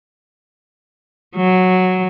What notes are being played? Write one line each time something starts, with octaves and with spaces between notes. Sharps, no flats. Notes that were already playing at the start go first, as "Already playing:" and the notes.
F#3